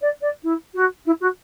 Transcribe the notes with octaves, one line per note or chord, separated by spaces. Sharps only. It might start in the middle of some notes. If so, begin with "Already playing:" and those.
D5
D5
E4
F#4
E4
F#4